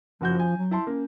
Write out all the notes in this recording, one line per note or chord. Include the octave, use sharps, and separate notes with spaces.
F#1 F3 F#4 G6
G#5
F#3
E4 A5 C6
A#3 C#4